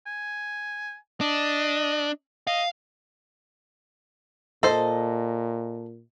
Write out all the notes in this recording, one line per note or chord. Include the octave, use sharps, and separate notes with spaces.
G#5
D4 D#5
D#5 F5
A#2 A4 C5 D#5